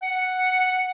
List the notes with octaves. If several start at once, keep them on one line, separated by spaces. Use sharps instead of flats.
F#5